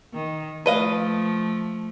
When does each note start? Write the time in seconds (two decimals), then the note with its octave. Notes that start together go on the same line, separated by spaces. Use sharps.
0.14 D#3
0.66 F3 A3 B4 D#5 F5